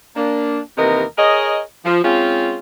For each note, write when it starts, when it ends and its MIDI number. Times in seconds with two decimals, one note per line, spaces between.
0.16 0.59 58
0.16 0.59 62
0.78 1.03 39
0.78 1.03 48
0.78 1.03 52
0.78 1.03 59
0.78 1.03 70
0.78 1.03 75
1.18 1.60 68
1.18 1.60 70
1.18 1.60 73
1.18 1.60 75
1.85 1.99 53
2.04 2.59 56
2.04 2.59 60
2.04 2.59 61
2.04 2.59 65